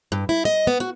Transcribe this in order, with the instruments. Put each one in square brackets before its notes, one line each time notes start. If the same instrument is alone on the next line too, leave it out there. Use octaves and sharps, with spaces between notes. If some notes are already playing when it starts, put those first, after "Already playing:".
[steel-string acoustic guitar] G2
E4
D#5
B3
F#4